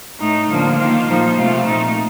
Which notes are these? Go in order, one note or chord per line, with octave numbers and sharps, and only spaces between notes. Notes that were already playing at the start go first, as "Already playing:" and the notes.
A2 A3 D#4
D3 F3 A#3 D4
D#3 A#3 F4
A#2 F3 A#3 D#4
C3 F3 A3 C4 F4
A#2 A3 D#4